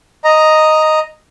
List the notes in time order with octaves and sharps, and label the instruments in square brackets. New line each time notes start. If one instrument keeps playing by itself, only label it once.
[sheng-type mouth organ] D#5 A#5